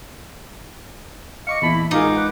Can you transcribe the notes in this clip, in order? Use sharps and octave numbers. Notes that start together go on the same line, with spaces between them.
D#5 F5 C#6 D6 C#7
E2 A#2 E4 A5 B5
A1 G#3 D#4 F4 F#4 G#4 A#4 D6
B4 F#5